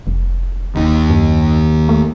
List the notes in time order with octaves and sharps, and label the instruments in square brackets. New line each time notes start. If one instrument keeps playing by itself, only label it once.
[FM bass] F1
[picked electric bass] D#2 D#3
[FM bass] F#2
A3